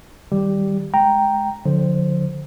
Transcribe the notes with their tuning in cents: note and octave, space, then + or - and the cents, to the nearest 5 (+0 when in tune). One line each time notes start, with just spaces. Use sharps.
D#3 +0 G3 +0 G4 +0
G#3 +15 G5 +0 A#5 +0
D3 -5 F3 +40 C5 +0